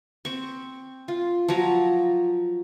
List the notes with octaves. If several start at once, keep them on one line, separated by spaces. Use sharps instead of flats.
C4 C#6
F4
F3 F#3 A#5